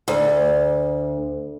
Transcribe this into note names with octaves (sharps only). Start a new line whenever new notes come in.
D2